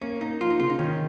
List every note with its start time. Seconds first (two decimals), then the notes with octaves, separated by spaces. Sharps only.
0.01 A#3 C#4
0.21 A#3 D#4
0.40 F3 F4
0.50 D#4
0.60 C#3 F4
0.70 D#4
0.79 D#3 C#4